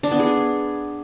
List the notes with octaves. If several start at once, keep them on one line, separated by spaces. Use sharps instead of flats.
D4
B3
G#4